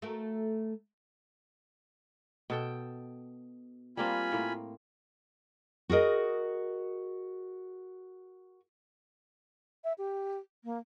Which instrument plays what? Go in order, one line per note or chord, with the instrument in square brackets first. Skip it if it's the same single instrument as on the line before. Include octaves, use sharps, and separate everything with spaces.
[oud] A3 F#4 A#4
[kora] B2 A4 G5
[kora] G3 A#3 C4 [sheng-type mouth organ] F4 G#5 B5
[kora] A2 A#3
[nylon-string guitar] F#4 G#4 A#4 D#5
[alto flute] E5
G4
A#3